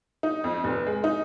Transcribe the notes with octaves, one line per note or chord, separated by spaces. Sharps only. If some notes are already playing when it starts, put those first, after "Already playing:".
D#4
F2
F1
G#3
D#4